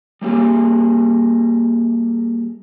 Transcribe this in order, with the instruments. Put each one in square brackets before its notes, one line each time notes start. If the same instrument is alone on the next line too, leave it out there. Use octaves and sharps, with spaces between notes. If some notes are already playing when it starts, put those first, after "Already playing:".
[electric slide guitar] G3 A#3 F4 G4 G#4